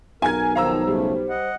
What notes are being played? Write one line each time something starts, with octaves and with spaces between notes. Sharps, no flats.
B1 A#4 G#5 G#6
D#3 F3 C5 F5 A#5 E6
C#3 G3 A3
D#5 F#5